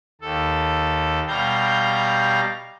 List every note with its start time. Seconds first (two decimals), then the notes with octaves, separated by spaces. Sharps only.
0.21 D#2 A4
1.28 B2 G3 F5 A#5 G6